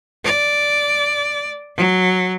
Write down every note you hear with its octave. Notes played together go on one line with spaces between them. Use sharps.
D5
F#3